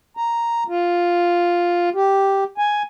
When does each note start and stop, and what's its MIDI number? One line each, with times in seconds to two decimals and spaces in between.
0.17 0.64 82
0.68 1.90 65
1.95 2.44 67
2.58 2.83 80